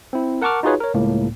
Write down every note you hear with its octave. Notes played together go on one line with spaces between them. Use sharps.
C4 E4
A#4 F#5 A5 C#6 D6 F6
D#4 F4 F#4 G#4 B4 C#5
A#4 C#5
C#2 A2 A#3